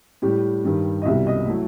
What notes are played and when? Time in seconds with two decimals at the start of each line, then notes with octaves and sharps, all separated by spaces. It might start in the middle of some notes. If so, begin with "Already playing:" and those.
0.22 A2 G3 G4
0.65 G2 D#3 G3
1.02 D#5
1.05 C2 B2 G3 E5
1.27 D#5
1.47 F#3 A3 E4